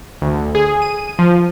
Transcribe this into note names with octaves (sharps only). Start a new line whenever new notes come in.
D2
G#4
D#7
F3